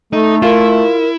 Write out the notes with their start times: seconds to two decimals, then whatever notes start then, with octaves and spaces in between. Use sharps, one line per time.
0.13 A3 D#4 A4
0.42 E4 F4 A#4